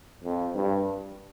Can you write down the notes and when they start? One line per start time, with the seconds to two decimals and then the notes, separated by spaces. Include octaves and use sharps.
0.24 F2
0.56 G2